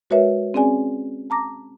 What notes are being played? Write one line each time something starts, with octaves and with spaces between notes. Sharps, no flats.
G#3 F#4 A#4 B4 C#5 E5
C4 C#4 G#4 D5 G#5
A5 A#5 D6 A#6